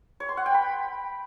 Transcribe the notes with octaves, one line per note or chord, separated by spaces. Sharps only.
C#5
C6
F#5
G5
B5